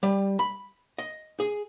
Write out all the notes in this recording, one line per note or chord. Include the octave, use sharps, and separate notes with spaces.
G3
B5
D#5
G#4